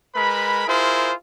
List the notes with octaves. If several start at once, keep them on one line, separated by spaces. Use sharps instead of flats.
G#3 A#4 B4 B5
E4 F4 G#4 A#4 C5